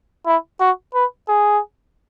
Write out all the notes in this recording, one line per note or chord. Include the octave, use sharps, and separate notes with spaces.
E4
F#4
B4
G#4